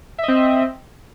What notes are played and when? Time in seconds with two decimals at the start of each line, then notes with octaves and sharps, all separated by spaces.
0.18 E5
0.23 D#5
0.28 C4